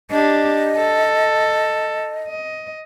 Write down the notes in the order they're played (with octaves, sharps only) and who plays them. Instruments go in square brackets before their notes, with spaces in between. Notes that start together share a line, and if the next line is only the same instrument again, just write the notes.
[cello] D4 G4 [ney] D#5
[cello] A4
D#5